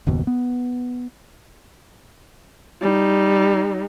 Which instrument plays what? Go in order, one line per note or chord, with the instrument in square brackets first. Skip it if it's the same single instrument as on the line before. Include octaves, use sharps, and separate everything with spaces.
[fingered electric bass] F#1 D#2 B2
B3
[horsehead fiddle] G3 D#4